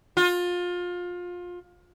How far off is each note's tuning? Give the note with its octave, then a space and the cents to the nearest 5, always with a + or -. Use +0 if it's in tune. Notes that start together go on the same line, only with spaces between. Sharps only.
F4 +25